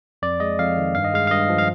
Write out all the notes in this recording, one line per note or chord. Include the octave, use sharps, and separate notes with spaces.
F2 D5
G#3 D#5
F2 F5
D#3
G2 F5
D#5
G#3 F5
F5
G2 D#5
F3
F5